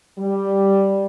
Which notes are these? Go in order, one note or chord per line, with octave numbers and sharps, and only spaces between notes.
G3